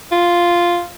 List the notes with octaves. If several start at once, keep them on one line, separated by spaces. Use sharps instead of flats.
F4